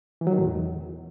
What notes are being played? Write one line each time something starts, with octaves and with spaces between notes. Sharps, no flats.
E3
F#3
D#3
A2
E2